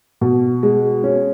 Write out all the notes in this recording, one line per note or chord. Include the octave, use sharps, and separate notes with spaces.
B2
G#3
C#4